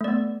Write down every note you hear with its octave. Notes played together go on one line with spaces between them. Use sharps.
A3 B3 D5